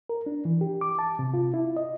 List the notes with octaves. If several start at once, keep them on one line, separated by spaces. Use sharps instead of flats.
A#4
D4
E3
G4
D6
A5
C3
F4
E4
D#5